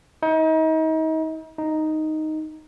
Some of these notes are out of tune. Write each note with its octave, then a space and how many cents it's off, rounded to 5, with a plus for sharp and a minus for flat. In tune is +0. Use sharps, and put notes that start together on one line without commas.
D#4 +35
D#4 +0